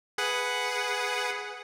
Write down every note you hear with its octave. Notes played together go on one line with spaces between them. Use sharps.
G#4 B4 F#5